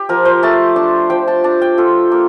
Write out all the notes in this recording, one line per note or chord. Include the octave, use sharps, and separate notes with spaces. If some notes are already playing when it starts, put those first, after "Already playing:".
Already playing: G4
F3 A#4
C5
A3 A5
D4 A5
F3 G5
A5
D4 A5
G5
F4 A4
A#3